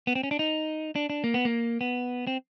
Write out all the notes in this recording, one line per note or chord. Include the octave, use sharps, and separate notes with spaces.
B3
C4
C#4
D4
D#4
D4
D4
A#3
B3
A#3
B3
C4